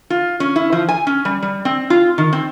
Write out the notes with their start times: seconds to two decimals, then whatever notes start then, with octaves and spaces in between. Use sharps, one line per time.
0.10 F4
0.40 C#4
0.56 E4
0.72 F3
0.89 G#5
1.07 C#4
1.25 G3
1.43 G3
1.65 C4
1.90 F4
2.18 D#3
2.33 C4